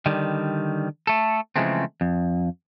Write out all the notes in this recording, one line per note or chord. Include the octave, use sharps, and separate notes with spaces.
D3 D#3 G3
A3 A4
C#3 E3 F3 G#3 A3 C4
F2